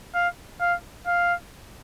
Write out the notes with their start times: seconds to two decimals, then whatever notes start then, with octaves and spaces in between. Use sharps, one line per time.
0.14 F5
0.61 F5
1.07 F5